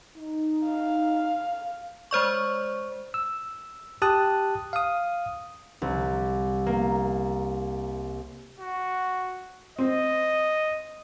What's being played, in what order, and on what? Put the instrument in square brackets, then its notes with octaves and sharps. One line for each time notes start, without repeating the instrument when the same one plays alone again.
[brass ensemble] D#4
[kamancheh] F5
[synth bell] G#3 C5 D5 C#6
[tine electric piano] E6
G4 A5 D#6 F#6
F5 D#6
[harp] C2
A#3
[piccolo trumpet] F#4
[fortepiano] C4 [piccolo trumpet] D#5